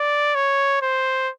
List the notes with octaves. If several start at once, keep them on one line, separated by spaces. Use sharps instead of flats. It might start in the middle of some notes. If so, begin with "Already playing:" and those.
Already playing: D5
C#5
C5